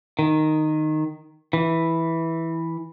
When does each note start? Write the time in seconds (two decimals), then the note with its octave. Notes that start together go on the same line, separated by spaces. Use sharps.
0.19 D#3
1.53 E3